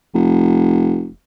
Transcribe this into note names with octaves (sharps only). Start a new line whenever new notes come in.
F1